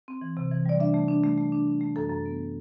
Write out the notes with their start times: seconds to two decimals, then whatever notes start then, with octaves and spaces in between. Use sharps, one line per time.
0.08 C4
0.22 E3
0.37 C3
0.52 E3
0.66 G3 D5
0.80 D4 E5
0.94 A3
1.08 D4
1.24 A3
1.38 A3
1.52 D4
1.68 D4
1.81 A3
1.96 F#2 A4
2.10 F#2
2.26 B3